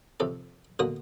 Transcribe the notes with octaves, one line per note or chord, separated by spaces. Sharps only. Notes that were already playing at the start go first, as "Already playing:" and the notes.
F2 C3 A4
B2 D3 A#3 F#4 D#6